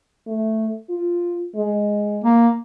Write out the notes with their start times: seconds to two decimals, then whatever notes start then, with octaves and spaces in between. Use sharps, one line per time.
0.27 A3
0.89 F4
1.55 G#3
2.24 A#3